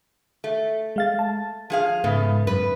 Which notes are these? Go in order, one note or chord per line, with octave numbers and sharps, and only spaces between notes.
A3
G#3 F5 A6
A5
F3 G#4 F5
G#2 C#3 A3 B3
F#2 B4